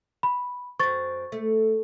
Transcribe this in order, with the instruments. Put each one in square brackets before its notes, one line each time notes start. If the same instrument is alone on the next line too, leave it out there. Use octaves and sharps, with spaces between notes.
[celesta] B5
[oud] F#2 C4 [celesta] C#6 A6
[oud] A3